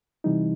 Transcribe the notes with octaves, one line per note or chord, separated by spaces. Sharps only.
C3 E3 G3 D#4